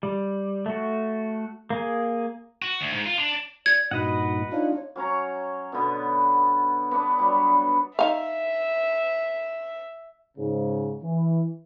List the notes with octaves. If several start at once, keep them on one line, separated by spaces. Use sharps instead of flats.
G3
A3 F#4
A#3 G#4
F#4
D2
G#2
F4
D4
D5 G#6
G2 A#2 D#4 F#4 B4 D#5 F#5
D4 D#4 F4 C#5
F#3 C#4 C#5 A#5
B2 D3 B3
B3 D4 D5
F#3 G3
D#4 E5 F5
G#2 C#3
E3